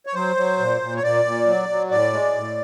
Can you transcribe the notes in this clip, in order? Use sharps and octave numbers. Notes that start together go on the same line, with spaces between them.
C#5
F#3 C5
F#3
A#2
A#2
C#5
A#2 D5
A#2
F#3
F#3
A2 D5
G#3
A2